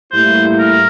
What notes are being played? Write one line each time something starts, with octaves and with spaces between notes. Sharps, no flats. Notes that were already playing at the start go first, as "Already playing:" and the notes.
A2 G3 A#3 E4 C5
A#4